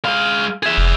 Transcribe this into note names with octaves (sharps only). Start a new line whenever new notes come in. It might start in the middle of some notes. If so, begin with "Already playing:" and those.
G#3 F5
G#4 E5
F1